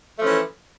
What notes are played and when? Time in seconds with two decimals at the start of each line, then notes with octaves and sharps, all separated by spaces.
0.18 A3
0.21 F3
0.24 C#4
0.27 E3